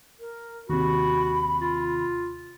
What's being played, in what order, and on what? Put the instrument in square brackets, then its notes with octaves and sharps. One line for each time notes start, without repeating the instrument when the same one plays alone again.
[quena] A#4
[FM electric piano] D#2 C3 [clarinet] F#4 [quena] B5
[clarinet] F4